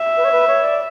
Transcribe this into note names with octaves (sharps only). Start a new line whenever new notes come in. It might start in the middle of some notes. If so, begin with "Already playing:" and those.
Already playing: E5
B4
C#5
B4
C#5
D5